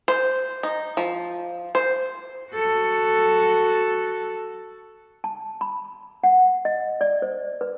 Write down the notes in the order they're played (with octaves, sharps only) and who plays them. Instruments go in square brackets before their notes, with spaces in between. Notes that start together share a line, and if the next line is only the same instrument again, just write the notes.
[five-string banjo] C5
D#4
F3
C5
[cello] F#4 A4
[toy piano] A5
B5
F#5
D#5
D5
C5
B4